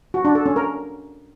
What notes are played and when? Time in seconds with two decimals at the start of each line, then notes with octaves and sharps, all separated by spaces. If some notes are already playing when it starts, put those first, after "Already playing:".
0.14 F#4
0.25 D4
0.35 A4
0.46 C#4
0.56 A#4